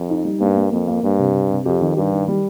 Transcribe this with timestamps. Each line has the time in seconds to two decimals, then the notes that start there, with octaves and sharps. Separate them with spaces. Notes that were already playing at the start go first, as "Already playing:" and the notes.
Already playing: F2
0.10 D#4
0.25 G3
0.40 G2 A#3
0.56 A#3
0.72 F2 A#3
0.88 A#3
1.03 G2 A#3
1.19 C3
1.34 C3
1.50 C3
1.65 F2 G4
1.81 D#3
1.97 G2 G4
2.12 D#3
2.28 G3